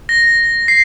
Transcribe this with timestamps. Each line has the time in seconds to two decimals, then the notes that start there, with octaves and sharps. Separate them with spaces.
0.09 A#6
0.68 C7